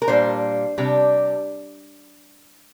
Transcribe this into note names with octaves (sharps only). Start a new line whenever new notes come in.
A#4
A#2 G3 D4 C5
C3 G3 D4